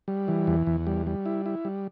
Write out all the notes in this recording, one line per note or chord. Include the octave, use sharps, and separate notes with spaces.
G3
E3
E2
E2
G3
G3
E4
E4
G3